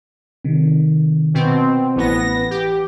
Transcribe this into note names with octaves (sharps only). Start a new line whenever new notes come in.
C3 D#3
B2 C4
A1 E3 B3 A#6
G4